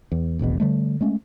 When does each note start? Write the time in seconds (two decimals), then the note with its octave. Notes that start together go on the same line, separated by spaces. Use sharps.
0.12 E2
0.39 F1 A#1 E2 B2
0.60 D3 G3 A3
1.01 G#3 A3 C#4